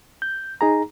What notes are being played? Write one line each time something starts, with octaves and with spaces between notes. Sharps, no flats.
G6
D#4 G#4 A#5